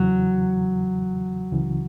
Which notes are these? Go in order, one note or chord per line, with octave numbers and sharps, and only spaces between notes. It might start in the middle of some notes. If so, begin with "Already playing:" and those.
Already playing: E2 C#3 E3 F#3
C#2 C#3 E3